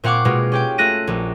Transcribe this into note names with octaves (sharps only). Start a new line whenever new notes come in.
A#2 C4 F5 F#5 C#6 D6
B2 G#3 C4 F4
C#4 G4 G5
A3 F4 F#6 A#6 D#7
A#1